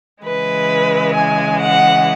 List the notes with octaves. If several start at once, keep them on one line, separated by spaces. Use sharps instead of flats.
C#3 E3 G#3 B4
G#5
F#5